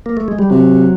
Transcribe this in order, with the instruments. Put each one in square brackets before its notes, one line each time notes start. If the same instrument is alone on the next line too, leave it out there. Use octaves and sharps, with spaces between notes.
[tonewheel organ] A#3
A3
G#3
G3
[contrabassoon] C3 [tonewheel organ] F#3